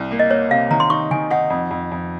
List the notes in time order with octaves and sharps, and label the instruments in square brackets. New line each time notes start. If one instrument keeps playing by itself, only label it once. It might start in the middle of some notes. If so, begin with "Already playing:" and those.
Already playing: [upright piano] C2
A#3
[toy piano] D#5
[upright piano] A#3 [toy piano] C#5
[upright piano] C3 [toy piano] F5
[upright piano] D#3 [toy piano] A#5
[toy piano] C6
[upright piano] D#4 [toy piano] C#6
[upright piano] D#3 [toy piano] G#5
[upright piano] D#4 [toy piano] F#5
[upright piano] F2
F2
F2